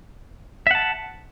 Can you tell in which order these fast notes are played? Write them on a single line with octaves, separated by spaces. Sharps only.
E5 F#5 A5